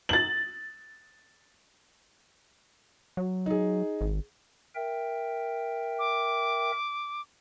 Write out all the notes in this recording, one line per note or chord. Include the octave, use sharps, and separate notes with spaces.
A6 F#7
F#3
D#4 G#4
G#1
A#4 E5 G5
D6